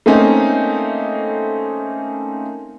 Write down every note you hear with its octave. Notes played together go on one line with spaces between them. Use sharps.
A3 A#3 C4 C#4 D#4